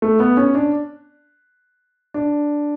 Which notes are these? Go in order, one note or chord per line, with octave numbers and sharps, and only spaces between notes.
A3
B3
C#4
D4
D4